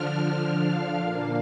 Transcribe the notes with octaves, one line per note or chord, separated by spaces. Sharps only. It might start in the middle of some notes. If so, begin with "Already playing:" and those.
Already playing: D3 F3 D4 F6
F5
A#2 A#3 D4